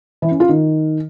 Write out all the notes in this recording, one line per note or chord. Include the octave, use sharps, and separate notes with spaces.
E3
C#4
F4
D#3